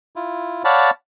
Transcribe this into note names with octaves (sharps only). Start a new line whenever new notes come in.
E4 F4
C#5 D5 F5 F#5 A5 B5